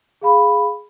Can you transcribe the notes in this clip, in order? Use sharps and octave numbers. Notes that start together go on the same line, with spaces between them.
G#4 F5 B5